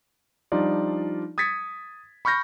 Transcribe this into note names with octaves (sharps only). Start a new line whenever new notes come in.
F3 G3 D4 D#4 F4 D5
D#6 G#6 A6 B6 C#7
B5 C#6 F6 G6 A#6